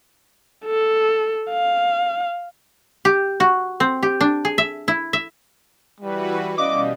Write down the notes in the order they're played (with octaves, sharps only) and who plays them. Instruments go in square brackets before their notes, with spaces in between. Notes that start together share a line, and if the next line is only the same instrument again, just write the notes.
[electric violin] A4
F5
[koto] G4
F#4
C4
G4
D4
G#4
E5
E4
E5
[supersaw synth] E3 F#4 B4 [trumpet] G3
[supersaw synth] B2 G3 [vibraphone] C#4 D5 F5 [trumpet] D#5 [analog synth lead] D6